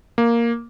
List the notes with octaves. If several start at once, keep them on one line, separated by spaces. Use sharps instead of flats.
A#3